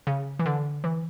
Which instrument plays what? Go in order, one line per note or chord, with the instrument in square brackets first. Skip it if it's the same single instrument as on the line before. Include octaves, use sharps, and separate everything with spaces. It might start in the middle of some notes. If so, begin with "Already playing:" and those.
[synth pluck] C#3
E3
D3
E3